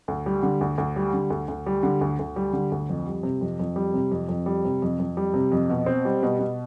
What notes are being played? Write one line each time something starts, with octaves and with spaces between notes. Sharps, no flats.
D2
G3
D3
D2
D2
G3
D3
D2
D2
G3
D3
D2
D2
G3
D3
D2
F2
G3
C3
F2
F2
G3
C3
F2
F2
G3
C3
F2
F2
G3
C3
F2
B2
C4
G3
B2
B2